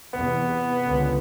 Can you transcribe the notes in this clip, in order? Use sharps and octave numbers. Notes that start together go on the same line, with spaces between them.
E2 C3 B3
C#2 D3